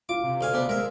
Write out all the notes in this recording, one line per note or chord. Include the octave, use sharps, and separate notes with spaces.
F4 D6
C3
D2 F5 G#5
C3 B3 D4
G#3 A#4 E5